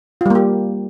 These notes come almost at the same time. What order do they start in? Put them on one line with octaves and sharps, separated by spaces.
F4 G3 A#3 G4